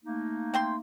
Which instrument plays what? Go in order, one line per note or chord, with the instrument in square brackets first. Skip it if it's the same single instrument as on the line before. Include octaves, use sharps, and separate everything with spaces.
[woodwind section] A3 A#3 D#4
[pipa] C4 G5 C6